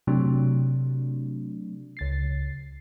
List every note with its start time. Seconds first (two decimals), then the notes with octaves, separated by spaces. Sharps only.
0.07 C3 F#3 A3 D4
1.97 C#2 A6 C7